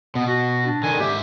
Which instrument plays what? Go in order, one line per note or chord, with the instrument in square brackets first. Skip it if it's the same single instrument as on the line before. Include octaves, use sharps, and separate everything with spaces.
[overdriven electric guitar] B2 [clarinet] B3
[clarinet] F#4
D4
[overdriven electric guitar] D3 D#3 [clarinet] G#5
[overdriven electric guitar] G#2 E5 [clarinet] G4